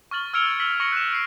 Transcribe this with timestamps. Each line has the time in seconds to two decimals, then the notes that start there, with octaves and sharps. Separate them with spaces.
0.11 C#6 F6 A6 F#7
0.33 E6 F6 G#6 C#7 D7 F7
0.60 E6 B6 F#7
0.80 C#6 A#6 C#7 F#7
0.92 F#6 E7
1.12 C7 D7